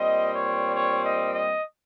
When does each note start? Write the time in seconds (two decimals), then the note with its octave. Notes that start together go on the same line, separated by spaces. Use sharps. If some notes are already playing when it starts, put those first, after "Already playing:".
Already playing: A#2 G3 C4 D#5
0.32 C#5
0.74 C#5
1.02 D#5
1.31 D#5